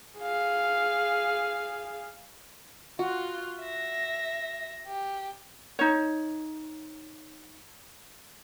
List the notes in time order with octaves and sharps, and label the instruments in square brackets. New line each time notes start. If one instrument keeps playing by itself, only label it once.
[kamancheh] G#4 F5
[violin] F4 [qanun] F#4
[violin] E5 A#6
G4
[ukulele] D#4 C#5